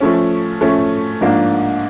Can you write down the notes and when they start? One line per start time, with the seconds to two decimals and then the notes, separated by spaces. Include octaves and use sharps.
0.01 F3 A3 C#4
0.61 F3 A3 C#4
1.21 G#2 F3 A#3 D4